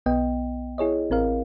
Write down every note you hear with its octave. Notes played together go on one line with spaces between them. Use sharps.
B1 B3 D#5 G5
E4 G#4 C#5 D#5
A1 C4 A#4 F5